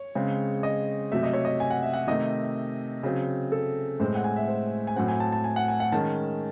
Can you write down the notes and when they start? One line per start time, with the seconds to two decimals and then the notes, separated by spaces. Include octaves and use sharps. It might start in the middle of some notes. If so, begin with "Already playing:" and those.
Already playing: C#5
0.15 C#3 G#3 C4
0.63 D#5
1.12 C3 F#3 A3 E5
1.23 D#5
1.33 C#5
1.45 D#5
1.60 G#5
1.70 F#5
1.82 E5
1.94 F#5
2.07 C3 D#3 A3 D#5
3.03 C#3 F#3 C4
3.52 A4
4.00 A2 G#3 C4 C5
4.15 F#5
4.24 G#5
4.36 E5
4.48 C5
4.87 G#5
4.96 A2 F#3 C4 F#5
5.08 G#5
5.20 A5
5.32 A5
5.44 G#5
5.56 F#5
5.68 G#5
5.80 F#5
5.92 D#3 G#3 C#4 A5